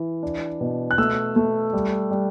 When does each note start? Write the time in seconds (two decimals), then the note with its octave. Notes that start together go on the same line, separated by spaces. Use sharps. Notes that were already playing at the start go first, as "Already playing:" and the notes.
Already playing: E3
0.23 D4
0.61 B2
0.91 F#6
0.98 A3 E6
1.36 A3
1.73 G3
2.11 G3